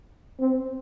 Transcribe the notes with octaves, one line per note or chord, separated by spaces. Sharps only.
C4